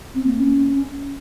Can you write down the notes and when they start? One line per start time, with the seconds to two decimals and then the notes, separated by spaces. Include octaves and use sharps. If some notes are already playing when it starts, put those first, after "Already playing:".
0.15 C4
0.26 A#3
0.38 C#4